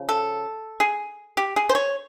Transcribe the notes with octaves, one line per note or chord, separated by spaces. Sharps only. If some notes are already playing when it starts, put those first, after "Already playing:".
Already playing: C#3 F3
A4
G#4
G4
G#4
C5
C#5